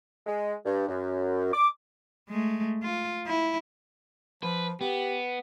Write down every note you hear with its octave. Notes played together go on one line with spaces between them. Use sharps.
G#3
G2
F#2
D6
G#3 A3
F4
E4
F3 B4
B3 G4